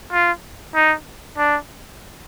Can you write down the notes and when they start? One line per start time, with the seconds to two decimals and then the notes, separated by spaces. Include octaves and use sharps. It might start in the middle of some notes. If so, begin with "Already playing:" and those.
0.13 F4
0.75 D#4
1.38 D4